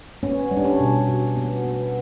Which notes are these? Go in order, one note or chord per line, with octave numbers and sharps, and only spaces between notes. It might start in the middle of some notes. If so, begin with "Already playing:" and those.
B3 C#4
G3
D4
C#4
B2
B2
B3
B3